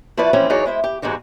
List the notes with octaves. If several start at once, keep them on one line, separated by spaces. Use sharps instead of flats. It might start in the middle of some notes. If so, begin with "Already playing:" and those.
F3 E4 F#4 B4 D5
E3 F3 A#3 C4 C#4
E2 F#3 D#4 G#4 C#5 D5
G#3 E4 C5 E5
G4
E2 G#2 G#3 F#4 G4